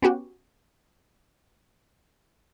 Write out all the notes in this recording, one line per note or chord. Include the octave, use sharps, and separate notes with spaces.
B3 C#4 F#4 G4